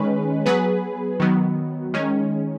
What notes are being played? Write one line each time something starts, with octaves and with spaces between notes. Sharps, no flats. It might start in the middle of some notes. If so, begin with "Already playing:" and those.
Already playing: D#3 G#3 C#4 B4
F#3 B3 G#4 B4
D#3 F#3 B3
D#3 G#3 C#4